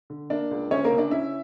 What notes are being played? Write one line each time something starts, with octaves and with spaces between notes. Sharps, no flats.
D3
A#3 D4 D5
C#2
D2 C#4 C#5
A#3 A#4
C#3
D4 D5
C#4 E4 E5